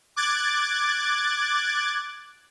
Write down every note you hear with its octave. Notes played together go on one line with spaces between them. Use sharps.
D6 F#6 G#6 A6